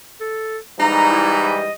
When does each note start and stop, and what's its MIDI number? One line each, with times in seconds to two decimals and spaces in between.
0.20 0.58 69
0.80 1.70 44
0.80 1.70 52
0.80 1.70 55
0.80 1.63 63
0.80 1.09 82
1.10 1.34 64
1.45 1.72 75